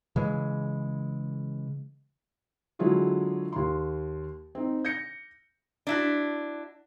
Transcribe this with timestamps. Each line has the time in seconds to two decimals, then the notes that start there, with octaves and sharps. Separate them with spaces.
0.16 C#3 E3 G#3
2.79 D3 F#3 G#3 E4 F4 G#4
3.52 D#2 C6
4.55 C4 D#4
4.85 G6 A#6 C#7
5.87 D4 E4 F#4